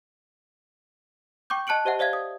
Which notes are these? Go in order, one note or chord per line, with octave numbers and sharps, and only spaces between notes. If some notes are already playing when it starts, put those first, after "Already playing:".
G5 C#6 D6 G6
D#5 A5 F#6 C#7 D7 F#7
G4 C5 D#5 E5 F#5
C5 D5 E5 F5 G#6
D#6